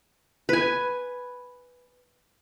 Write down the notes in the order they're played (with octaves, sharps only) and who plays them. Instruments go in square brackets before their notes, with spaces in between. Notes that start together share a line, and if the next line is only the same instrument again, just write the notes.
[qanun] B4 G#5